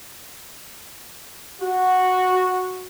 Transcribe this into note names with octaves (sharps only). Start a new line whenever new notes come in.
F#4